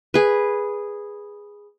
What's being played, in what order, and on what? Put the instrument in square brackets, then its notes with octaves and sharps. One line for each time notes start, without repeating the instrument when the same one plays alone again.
[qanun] G#4 B4